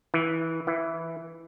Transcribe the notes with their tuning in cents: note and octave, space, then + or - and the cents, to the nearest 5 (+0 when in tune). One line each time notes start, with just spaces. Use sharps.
E3 -15
E3 +0